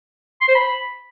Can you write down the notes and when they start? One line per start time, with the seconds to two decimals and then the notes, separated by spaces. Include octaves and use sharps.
0.41 C6
0.48 C5
0.55 B5